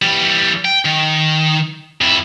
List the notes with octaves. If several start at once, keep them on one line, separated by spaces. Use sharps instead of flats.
E3 G3
G5
D#3
F2 E4